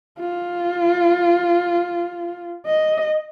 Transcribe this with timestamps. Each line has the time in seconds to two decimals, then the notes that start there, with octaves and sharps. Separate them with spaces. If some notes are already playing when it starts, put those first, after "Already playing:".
0.19 F4
2.65 D#5